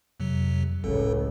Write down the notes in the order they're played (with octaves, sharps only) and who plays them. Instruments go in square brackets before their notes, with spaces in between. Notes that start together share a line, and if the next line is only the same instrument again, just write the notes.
[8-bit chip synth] F2 C3 F#3
[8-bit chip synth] G1 A4 [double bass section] C#2 A2